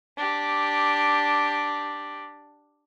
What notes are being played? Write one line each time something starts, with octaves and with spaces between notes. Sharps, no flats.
D4 G4